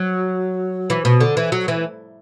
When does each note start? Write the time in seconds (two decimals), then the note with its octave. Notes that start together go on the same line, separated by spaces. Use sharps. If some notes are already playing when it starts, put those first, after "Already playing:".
Already playing: F#3
0.90 E3
1.05 B2
1.21 D3
1.37 E3
1.52 F#3
1.68 E3